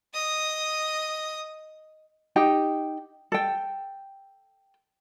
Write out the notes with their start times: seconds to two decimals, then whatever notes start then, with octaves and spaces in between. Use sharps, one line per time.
0.14 D#5 D#6
2.36 D#4 G4 G5
3.32 A4 G5